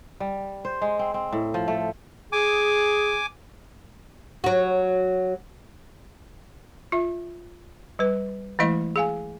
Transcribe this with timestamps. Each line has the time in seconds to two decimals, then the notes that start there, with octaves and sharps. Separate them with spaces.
0.20 G3
0.65 C5
0.82 G#3
0.99 C4
1.14 C4
1.32 A2
1.54 F3
1.68 A3
2.32 G#4 G#5 D6
4.44 F#3 F#4
6.92 F4 E5
7.99 G3 B4
8.59 E3 G#3 A3 E4 D#5
8.96 G#4 F5 G#5